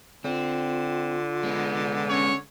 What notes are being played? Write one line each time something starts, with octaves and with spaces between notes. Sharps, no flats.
D3 C4 F4
G#3 B3
C#4 C#5